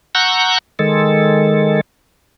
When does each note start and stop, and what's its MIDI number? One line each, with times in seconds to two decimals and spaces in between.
0.15 0.58 78
0.15 0.58 82
0.15 0.58 85
0.15 0.58 88
0.15 0.58 90
0.15 0.58 91
0.79 1.81 51
0.79 1.81 56
0.79 1.81 69